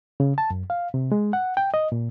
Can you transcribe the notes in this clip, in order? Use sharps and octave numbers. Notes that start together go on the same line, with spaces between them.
C#3
A5
F#2
F5
C3
G#3
F#5
G5
D#5
A#2